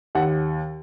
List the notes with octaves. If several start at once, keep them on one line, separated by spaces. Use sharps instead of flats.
D#2 F#5